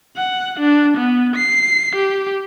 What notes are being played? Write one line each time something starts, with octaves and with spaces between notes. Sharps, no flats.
F#5
D4
B3
C7
G4